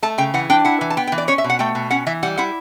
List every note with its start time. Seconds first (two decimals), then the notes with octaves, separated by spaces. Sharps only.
0.03 A3 A5
0.18 C#3 G5
0.34 E3 F#5
0.50 D4 G5
0.65 E4 F#5
0.81 E3
0.90 A5
0.97 B3 G5
1.07 G5
1.12 E3
1.18 D5
1.28 C#4 C#5
1.38 E5
1.44 B2
1.50 F#5
1.59 A3 G5
1.75 B2
1.91 C#4 F#5
2.07 E3 E5
2.23 G3 F#5
2.37 E4 F#5